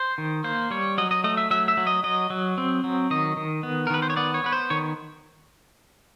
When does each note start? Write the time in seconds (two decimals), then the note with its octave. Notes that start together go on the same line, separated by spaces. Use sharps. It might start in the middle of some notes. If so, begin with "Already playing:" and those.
Already playing: C5
0.18 D#3
0.44 A#3 C5
0.71 G3 C#5
0.98 F#3 D#5
1.11 D#5
1.24 A3 D#5
1.37 E5
1.51 F#3 E5
1.68 E5
1.77 F#3
1.87 D#5
2.04 F#3 D#5
2.30 F#3
2.58 C4
2.84 F#3
3.10 D#3 D#5
3.37 D#3
3.63 B3
3.87 A#4
3.90 D#3 B4
4.02 C5
4.10 C#5
4.16 B3 D5
4.34 C#5
4.44 B3 B4
4.52 C5
4.70 D#3 C#5